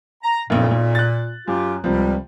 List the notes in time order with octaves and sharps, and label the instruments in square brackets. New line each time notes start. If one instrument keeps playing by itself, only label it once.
[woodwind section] A#5
[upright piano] F#1 B1 F2 [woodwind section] A#2
[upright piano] B1
F#6 A6
[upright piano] F#2 [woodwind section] F4 G4
[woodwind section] C#2 G3 [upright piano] C3 F3